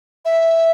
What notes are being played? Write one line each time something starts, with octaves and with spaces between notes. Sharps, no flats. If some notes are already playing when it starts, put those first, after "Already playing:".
E5